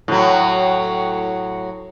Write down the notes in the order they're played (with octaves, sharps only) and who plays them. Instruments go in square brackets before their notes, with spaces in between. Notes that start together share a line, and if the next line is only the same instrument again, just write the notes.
[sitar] A2 F#3